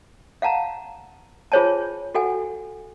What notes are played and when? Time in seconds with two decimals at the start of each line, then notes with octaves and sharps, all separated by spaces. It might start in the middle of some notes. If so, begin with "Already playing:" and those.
0.42 F5 F#5 A5 A#5
1.52 F4 G#4 C5 C#5 G#5 A5
2.15 F#4 A4 F#5 G#5